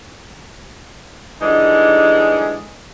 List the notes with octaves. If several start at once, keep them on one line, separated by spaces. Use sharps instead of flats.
D3 E3 G3 G#3 D#4 G#4